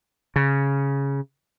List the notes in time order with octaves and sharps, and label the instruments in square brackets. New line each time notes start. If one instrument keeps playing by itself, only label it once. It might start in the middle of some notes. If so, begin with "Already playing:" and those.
[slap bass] C#3